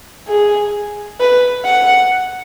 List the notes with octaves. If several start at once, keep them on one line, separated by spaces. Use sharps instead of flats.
G#4
B4
F#5